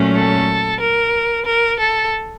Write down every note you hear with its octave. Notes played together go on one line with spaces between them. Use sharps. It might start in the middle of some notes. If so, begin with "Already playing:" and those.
Already playing: A#2 F#3 A3 C#4
A4
A#4
A#4
A4